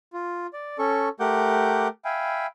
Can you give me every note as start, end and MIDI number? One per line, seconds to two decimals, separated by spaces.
0.13 0.47 65
0.53 0.77 74
0.79 1.09 61
0.79 1.09 69
0.79 1.09 85
1.20 1.88 57
1.20 1.88 67
1.20 1.88 70
1.20 1.88 78
1.20 1.88 86
1.20 1.88 91
2.05 2.47 76
2.05 2.47 77
2.05 2.47 79
2.05 2.47 80
2.05 2.47 83